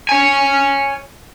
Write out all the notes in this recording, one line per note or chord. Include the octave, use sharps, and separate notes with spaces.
C#5 G#5